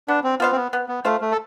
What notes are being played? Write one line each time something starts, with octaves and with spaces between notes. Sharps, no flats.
B3 D4
C4
B3 F4 C5 F5
C4
B3
B3
B3
A3 F4 C5 F5
A3
A4